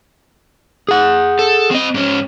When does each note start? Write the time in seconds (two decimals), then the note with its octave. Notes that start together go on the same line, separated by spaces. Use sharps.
0.89 G#4 F#5
1.39 A4
1.71 C4 D#5
1.94 G#2 C#4